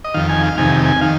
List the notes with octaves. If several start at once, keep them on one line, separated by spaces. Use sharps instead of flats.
D#5
F2 D#3 F5
G#5
F5
F2 C3 D#3 G#5
G#5
D#3 F5